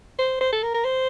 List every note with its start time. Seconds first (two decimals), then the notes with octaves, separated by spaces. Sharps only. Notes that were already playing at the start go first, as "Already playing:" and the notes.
0.19 C5
0.41 C5
0.53 A4
0.63 A#4
0.75 A#4
0.85 C5